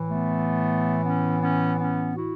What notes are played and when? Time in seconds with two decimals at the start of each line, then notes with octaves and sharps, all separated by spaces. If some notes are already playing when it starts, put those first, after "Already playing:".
Already playing: A2 E3
0.09 A3 B3
1.04 B3 C#4
1.42 B3 C#4
1.79 B3 C#4
2.17 E4 F#4